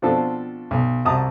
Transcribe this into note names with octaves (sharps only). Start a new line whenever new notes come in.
B2 F3 C4 D4 F4 A4
B1
C2 F#4 A5 A#5 D#6